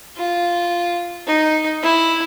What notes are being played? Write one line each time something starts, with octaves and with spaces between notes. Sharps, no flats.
F4
D#4
E4